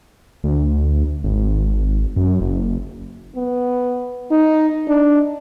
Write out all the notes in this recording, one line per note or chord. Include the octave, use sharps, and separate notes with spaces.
D2
G#1
F#2
F#1
B3
D#4
D4